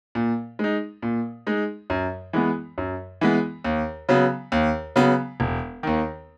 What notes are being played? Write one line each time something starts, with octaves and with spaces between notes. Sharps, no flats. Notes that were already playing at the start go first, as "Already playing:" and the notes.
A#2
G#3 D#4
A#2
G#3 D#4
F#2
E3 G#3 B3
F#2
E3 G#3 B3
D#2
C#3 F#3 B3
D#2
C#3 F#3 B3
E1
D#2 D#3